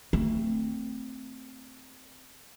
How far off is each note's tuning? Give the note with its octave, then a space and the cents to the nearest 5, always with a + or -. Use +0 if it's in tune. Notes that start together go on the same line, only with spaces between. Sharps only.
A3 +20 C4 +0